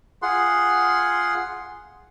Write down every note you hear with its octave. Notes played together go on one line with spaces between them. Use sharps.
F4 G#4 F#5 C6